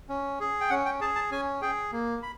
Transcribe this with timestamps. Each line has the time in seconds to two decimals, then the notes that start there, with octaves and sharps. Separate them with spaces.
0.09 C#4
0.40 G#4
0.61 G5
0.70 C#4 F#5
0.85 G5
1.01 G#4 A5
1.15 A5
1.31 C#4 G#5
1.61 G#4 G5
1.92 A#3
2.22 B5